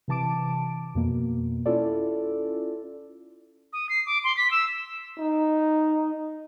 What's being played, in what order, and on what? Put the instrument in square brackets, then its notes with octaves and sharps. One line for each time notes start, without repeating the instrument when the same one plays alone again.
[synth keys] C3 E3 A5 D6 D7
F2 B2 A#3
C#4 E4 F4 A4 D5
[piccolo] D#6
C7
D6
C6
B6
E6
[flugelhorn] D#4